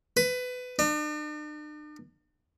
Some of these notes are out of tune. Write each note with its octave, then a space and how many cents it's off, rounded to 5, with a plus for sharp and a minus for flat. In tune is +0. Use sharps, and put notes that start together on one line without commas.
B4 +20
D4 +45